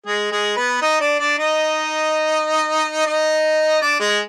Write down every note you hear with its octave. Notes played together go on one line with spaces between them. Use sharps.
G#3 G#4
G#3 G#4
B3 B4
D#4 D#5
D4 D5
D4 D5
D#4 D#5
D#4 D#5
D4 D5
G#3 G#4